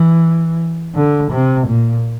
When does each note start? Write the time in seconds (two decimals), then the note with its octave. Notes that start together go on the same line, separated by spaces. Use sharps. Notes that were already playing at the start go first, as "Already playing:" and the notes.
Already playing: E3
0.95 D3
1.31 C3
1.67 A#2